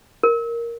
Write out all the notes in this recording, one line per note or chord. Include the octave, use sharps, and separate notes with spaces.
A#4